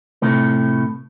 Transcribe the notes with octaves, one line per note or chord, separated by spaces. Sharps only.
A2 C3 A3